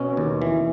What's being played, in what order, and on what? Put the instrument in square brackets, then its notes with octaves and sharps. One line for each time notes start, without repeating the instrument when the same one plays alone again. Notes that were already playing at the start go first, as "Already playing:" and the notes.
Already playing: [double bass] B2 [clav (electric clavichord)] C#4
[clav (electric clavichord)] D#2
E3